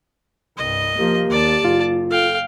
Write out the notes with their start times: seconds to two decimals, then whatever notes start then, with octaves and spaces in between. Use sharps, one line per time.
0.58 C2 G2 D#5
0.98 F3 A#3 G4
1.31 D#2 D5 A5
1.65 F#1 F4
2.11 A4 F5 G5